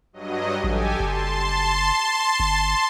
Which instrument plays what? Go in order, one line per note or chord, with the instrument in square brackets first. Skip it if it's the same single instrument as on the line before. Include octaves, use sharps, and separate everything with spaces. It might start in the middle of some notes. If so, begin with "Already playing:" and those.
[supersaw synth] G2 F#3 D#5
[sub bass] A1 [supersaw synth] G4 A4 G#5
[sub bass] F#1 [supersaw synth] A5 C6
[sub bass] G1